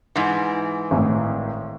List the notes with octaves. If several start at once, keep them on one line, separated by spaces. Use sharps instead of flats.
G#2 E3
G#1 A2